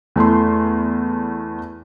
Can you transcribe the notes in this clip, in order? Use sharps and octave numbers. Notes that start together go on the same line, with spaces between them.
E2 A3 E4 C6